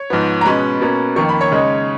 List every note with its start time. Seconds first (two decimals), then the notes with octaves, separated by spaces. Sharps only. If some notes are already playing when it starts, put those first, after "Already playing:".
Already playing: C#5
0.10 G#2 F3 B3
0.41 A#5
0.45 B2 G#3 C#4 B4 B5
0.81 B2 A#3 C#4
1.16 F2 D#3 A#3 C#6
1.29 B5
1.41 C#5 C#6
1.52 C#3 G#3 D#4